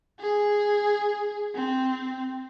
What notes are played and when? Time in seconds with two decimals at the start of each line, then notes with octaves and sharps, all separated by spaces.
0.20 G#4
1.55 C4